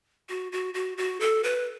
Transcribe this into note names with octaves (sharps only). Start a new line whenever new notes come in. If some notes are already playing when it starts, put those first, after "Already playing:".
F#4
F#4
F#4
F#4
A4
B4